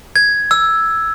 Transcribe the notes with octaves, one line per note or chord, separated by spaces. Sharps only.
G#6
E6